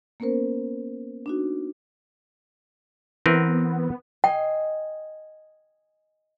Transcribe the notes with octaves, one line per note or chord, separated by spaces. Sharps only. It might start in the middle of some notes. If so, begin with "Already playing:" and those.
A#3 B3 C#4 A#4 C5
D4 D#4 F#4
E3 B3 C4 A#4 B4
D#5 G5 G#5 C7